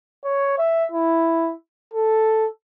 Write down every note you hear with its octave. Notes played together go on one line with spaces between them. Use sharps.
C#5
E5
E4
A4